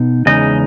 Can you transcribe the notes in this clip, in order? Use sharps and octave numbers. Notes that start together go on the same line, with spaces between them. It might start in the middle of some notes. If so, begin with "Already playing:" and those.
Already playing: B2 D#4
E2 C#3 G#3 D#4 D#5